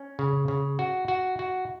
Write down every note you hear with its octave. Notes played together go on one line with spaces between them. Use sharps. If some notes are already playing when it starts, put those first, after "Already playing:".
Already playing: C#4
C#3
C#3
F#4
F#4
F#4